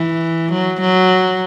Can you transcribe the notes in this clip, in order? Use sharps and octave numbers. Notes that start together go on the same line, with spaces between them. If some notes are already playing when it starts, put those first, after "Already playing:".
Already playing: E3
F#3
F#3